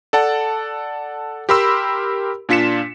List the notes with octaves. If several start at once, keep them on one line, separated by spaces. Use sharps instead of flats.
A4 D5 F#5 A5
G4 A#4 B5 C6 E6
A#2 D4 F4 B6 C#7 E7